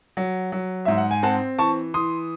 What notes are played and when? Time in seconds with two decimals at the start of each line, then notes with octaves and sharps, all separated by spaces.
0.17 F#3
0.52 F#3
0.85 G#2 E5
0.98 F#5
1.11 G#5
1.23 C4 F#5 A5
1.59 E3 A5 C#6
1.94 E3 C6 D#6